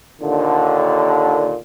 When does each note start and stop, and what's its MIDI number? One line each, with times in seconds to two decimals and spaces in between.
0.22 1.57 39
0.22 1.57 46
0.22 1.57 50